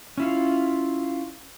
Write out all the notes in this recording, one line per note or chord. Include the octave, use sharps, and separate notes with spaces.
C#4 E4 F4